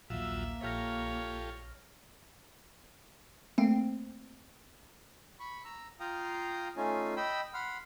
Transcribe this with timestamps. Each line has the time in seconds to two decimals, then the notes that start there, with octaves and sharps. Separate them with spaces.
0.10 A#1 D#2 F#3 A#3 F4 E5 E6
0.63 A#1 F4 G4 A4 C#5 F6 A#6
3.58 A3 A#3 C4
5.40 B5 C#6
5.65 A#5 E6
6.00 F4 F5 G5 A#5 D#6
6.77 A3 C#4 D#4 F4 G#5
7.17 D#5 G5 B5 E6
7.54 F#5 B5 C6 F6